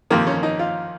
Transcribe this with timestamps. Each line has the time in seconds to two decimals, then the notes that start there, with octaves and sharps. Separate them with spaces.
0.10 F2 C3 D#3 A#3
0.27 C#4
0.43 D#4
0.59 F4